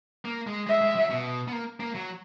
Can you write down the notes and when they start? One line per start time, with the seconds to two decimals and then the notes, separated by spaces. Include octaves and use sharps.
0.25 A#3
0.47 G#3
0.67 G#3 E5
0.82 G#3
0.95 F#3
1.10 B2
1.48 B3
1.52 A#3
1.80 A#3
1.95 F#3